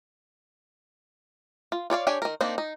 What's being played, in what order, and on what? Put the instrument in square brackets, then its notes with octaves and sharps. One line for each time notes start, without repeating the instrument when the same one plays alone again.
[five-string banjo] F4
F4 C#5 D5 F5
D4 G4 C#5 G#5
D#3 A#4
A#3 C4 D4 D#4
D#4